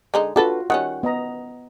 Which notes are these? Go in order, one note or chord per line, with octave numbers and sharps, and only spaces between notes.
D3 G#3 D#4
D4 F4 F#4 A4 B4
D#3 G3 C#4 F#5
B3 D#5 A#5